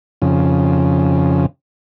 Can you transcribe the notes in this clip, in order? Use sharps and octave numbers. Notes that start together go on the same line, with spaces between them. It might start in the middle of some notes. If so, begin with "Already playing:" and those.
F2 C#3